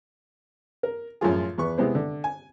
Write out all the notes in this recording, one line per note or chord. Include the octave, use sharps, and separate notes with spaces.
A#4
F#2 A2 E3 F3 F4 G#4
E2 B4 C#6
C3 E3 G#3 B3 C5
D3
G#5